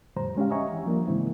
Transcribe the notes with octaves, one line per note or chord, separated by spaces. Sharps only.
F2 A2 D3 G3 C5 A#5
G#3 C#4 D4 G4 F5
D#5 E5 F#5 G#5 A#5 C#6
E3
F3 G3 A#3 D4
G#2 C#3 E3 G#3 C4 E4